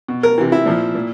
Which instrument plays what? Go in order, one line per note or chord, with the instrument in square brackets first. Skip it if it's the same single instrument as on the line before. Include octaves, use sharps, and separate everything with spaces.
[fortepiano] B2
A#4
C3 E3
E4
A#2 F3
A#2